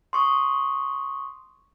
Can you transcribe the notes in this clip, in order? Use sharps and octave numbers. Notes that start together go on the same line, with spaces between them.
C6 C#6 D#6